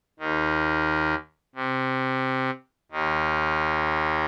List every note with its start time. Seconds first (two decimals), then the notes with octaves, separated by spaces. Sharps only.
0.19 D#2 D#3
1.55 C3
2.91 D#2 D#3